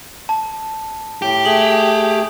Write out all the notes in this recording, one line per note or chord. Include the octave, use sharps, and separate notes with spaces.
A5
A2 G4
A3 G#4 F#7